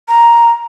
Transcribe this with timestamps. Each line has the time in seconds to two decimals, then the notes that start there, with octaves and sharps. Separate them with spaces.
0.08 A#5